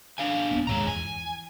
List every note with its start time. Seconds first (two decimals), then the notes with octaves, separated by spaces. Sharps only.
0.18 D4 F5 G#5
0.51 E2 A#3 B3
0.67 D#2 G#2 C3 G#3 C#5 A#5
0.87 E2 F3 G#5
1.05 E3